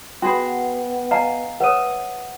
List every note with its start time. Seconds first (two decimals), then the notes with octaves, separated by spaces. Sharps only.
0.22 B3 F#4 G#4 B4 G5 C6
1.11 D#5 F5 G#5 A#5
1.60 B4 C#5 E5 F#5 D#6 D#7